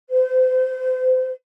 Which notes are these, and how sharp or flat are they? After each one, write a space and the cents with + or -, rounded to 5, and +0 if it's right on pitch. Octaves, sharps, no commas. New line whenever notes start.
C5 -35